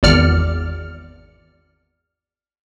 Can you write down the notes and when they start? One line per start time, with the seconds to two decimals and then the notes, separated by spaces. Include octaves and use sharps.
0.03 G#1 E2 D5 F6 C#7